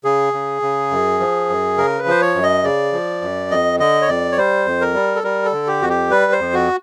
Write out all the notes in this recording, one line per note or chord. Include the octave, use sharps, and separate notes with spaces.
C#3 G#4
C#3
C#3
F#2
F3
F#2
C#3 A#4
B4
F3 C5
C#5
F#2
D#5
C#3 D5
F3
F#2
F2 D#5
D3 D#5
C#5
F2 D5
C#5
G3 C5
F2
A#4
G3
A4
G3 A#4
A4
D3
G4
F2 F#4
G4
G3 B4
C5
F2
F#4